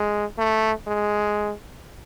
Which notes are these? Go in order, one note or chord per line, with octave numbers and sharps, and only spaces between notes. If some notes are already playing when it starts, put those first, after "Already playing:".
Already playing: G#3
A3
G#3